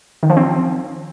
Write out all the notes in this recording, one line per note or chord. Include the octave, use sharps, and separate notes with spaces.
D#3
F3
C4